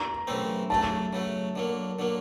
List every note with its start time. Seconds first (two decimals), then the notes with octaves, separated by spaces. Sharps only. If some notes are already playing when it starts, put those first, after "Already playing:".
Already playing: A#5
0.27 F#2 C#3 E3 A3 C4
0.70 C#3 F#3 A3 A5
1.13 C#3 F#3 A3
1.56 D3 F#3 A#3
1.99 D3 F#3 A#3